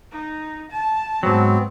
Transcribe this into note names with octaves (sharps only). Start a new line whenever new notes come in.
D#4
A5
G#2 F#3 B3 C4